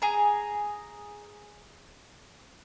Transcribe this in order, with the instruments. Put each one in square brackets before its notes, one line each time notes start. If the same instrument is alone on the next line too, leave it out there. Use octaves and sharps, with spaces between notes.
[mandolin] G#4 A#5